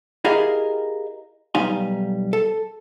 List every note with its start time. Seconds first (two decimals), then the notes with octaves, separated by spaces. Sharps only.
0.24 E4 G4 G#4 A#4 D#5 F5
1.55 B1 G3 D#4 F5 G#5
2.33 A4